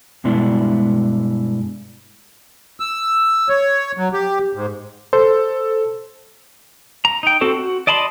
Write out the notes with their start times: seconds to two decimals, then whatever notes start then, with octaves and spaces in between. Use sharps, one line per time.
0.24 G2 B2 G#3 B3 D4 E4
2.80 E6
3.49 C#5
3.97 F#3
4.13 G4
4.55 G#2
5.13 A4 C5
7.05 A#5
7.23 D#4 G5
7.41 C4 F#4 A4 C5
7.54 F#4
7.87 D5 D#5 A5 B5 C6